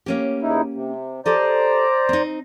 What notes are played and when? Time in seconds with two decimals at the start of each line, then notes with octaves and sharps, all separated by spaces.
0.06 A#3 C#4 G4
0.42 E2 D#4 E4
0.74 C3
1.26 G4 A4 C5 D5 D#5 A#5
2.09 C4 D#4